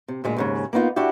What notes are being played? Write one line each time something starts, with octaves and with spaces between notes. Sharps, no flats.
C3
D2 A#2 G#3
D#2 G#2 C#3
A#3 B3 D#4 F4
D4 E4 F#4 G4